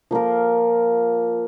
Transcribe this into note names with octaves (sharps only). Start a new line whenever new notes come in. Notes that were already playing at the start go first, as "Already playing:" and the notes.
F3 A#3 F4 A#4